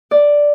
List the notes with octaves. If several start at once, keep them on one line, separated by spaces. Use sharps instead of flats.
D5